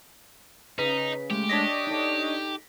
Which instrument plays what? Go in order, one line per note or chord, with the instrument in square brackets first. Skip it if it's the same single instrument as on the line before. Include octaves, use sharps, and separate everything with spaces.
[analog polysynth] C#3 [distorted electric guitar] D#4 [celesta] B4 B6
[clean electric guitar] G#3 A3 [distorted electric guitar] G4
[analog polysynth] D4 C#5 D#5 [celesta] A#6 B6
[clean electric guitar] D#4 A4